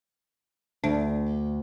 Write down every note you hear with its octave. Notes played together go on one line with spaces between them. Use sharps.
D2 D4